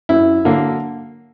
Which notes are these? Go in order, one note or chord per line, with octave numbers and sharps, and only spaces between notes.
F#2 E4
D3 F#3 A#3